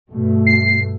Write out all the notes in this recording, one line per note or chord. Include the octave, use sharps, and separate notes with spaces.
G2 B2 A3
C7